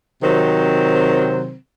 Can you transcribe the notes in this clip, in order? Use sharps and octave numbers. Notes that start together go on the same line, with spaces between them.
C3 D#3 F#3 C4